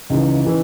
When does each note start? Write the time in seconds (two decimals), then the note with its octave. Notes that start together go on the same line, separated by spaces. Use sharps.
0.10 C#2 C#3 E3 D#4
0.45 C#3 E3